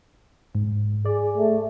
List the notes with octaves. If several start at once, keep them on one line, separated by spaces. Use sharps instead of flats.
G#2
G#4 D5
A3